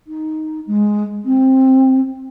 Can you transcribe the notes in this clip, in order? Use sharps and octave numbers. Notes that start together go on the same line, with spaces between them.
D#4
G#3
C4